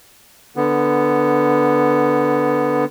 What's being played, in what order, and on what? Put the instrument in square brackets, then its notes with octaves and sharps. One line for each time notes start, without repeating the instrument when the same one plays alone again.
[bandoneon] D3 B3